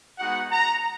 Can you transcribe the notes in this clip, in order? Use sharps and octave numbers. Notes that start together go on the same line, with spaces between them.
G#3 B3 D#4 F#4 F#5
A#5